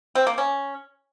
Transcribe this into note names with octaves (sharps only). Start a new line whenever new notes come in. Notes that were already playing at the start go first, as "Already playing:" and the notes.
C4
A#3
C#4